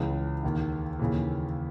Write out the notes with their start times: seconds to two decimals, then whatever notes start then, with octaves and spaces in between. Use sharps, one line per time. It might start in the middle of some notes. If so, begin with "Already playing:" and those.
Already playing: C#2 C#3 E3 G#3
0.43 D#2 D#3
0.99 D#2 C#3 E3